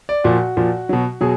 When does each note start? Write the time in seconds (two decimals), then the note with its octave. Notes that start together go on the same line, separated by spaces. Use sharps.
0.09 D5
0.24 A#2 F3 F#4
0.57 A#2 F3
0.89 B2 F#3
1.21 B2 F#3 G#4